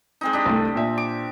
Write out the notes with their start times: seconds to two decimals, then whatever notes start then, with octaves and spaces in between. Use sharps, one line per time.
0.21 G#3 C4 D#4
0.33 D4 G4 D#5 D#6
0.46 C2 A3
0.75 A#2 E5
0.98 D6